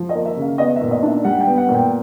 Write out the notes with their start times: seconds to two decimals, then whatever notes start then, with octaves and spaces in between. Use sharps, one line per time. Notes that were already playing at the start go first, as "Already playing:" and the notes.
Already playing: F3
0.09 D#5
0.15 A#3
0.25 E5
0.37 C#3
0.42 F5
0.58 B3 D#5
0.76 E5
0.81 A#2
0.91 D#5
1.03 D4
1.08 E5
1.24 G3 F#5
1.40 G5
1.47 B3
1.58 F#5
1.69 A#2
1.74 G5